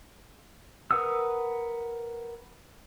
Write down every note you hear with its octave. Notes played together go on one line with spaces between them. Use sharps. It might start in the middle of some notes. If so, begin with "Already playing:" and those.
A#4 B4 F#5 D#6 E6